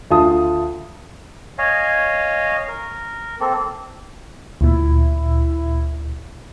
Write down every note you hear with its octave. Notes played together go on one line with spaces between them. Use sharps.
D2 F4 A5 D#6
C#5 D#5 F5 G#5
A#4
A#3 C4 A4
D2 A#2 E4